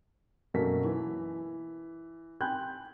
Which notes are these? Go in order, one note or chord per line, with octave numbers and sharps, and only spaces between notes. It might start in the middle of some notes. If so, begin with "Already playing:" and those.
F#2 B2 F#3 A#3 A4 B6
E3
G5 G#5 B5 C6 F#6 G6